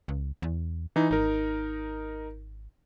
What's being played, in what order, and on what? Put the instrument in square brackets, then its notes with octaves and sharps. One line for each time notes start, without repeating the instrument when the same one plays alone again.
[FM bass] C#2
E2
[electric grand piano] E3 D#4
[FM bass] G#1 [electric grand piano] D#4 A#4